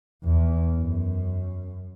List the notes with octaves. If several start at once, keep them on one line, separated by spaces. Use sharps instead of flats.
E2
F#2